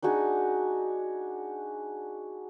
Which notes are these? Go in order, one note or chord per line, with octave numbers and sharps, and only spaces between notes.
D4 D#4 F#4 G#4